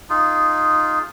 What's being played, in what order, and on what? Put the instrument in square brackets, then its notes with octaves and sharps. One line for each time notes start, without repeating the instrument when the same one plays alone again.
[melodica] D#4 F4 G#4